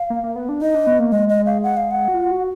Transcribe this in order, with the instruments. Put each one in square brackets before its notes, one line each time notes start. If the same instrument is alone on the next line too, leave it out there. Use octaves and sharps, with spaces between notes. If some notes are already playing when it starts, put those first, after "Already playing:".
Already playing: [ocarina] F5
[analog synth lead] A#3
A#3
B3
D4
[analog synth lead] D#4 [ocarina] D#5
[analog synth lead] D4
B3
A#3
[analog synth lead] G#3 [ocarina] D#5
[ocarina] D#5
F5
F#5
F5
F#5
[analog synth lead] F#4
F4
F#4